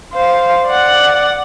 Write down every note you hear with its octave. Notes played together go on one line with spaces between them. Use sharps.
C5 F5
D5 F#5